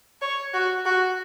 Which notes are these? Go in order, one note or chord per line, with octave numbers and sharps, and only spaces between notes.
C#5
F#4
F#4